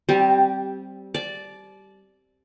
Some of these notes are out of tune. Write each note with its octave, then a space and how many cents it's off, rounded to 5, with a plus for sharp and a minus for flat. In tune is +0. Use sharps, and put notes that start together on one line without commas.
G3 -15 C4 +5 G4 +0
D5 +0 A5 -40